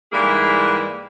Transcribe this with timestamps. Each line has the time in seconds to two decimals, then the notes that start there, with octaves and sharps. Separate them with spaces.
0.12 G#2 E3 G3 A#3 E4 G#4